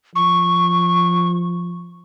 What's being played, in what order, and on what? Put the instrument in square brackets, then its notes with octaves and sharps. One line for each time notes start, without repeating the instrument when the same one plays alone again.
[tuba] F3 [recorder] C#6